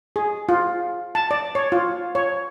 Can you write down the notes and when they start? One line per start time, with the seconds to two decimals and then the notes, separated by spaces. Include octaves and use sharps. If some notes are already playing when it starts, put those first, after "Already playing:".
0.16 G#4
0.49 F4
1.15 A5
1.31 D5
1.55 C#5
1.72 F4
2.15 C#5